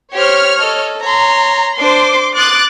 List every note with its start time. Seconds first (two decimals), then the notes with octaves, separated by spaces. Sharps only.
0.12 G4 C5 C#5 F6
0.58 A4 D#5
1.02 C#5 A#5 C6
1.77 D4 C5 C6 D6
2.35 C6 D6 D#6 F#6 A6